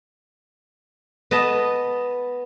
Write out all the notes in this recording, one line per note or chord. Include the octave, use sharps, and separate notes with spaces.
B3 B4 D#5 A5